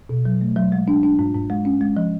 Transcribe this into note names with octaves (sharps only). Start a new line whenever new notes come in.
B2
F#3
A3
F#3
G#3
D4
D4
G#2
G#2
G#3
C#4
G#3
F3